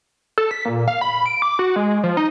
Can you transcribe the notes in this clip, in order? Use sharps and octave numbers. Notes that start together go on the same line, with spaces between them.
A4
B6
A#2
F5
B5
D7
D6
F#4
G#3
F3
D#4